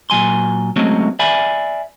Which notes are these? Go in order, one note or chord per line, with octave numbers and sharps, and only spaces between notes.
A#2 F#3 G#5 C6
F#3 G#3 A3 C4 C#4
D5 E5 G#5 B5